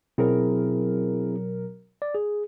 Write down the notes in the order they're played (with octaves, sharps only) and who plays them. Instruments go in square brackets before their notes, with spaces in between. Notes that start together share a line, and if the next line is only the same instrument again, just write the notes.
[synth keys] B2 F#3 A#4 [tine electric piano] C4 E4 G#4
[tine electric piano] D5
G#4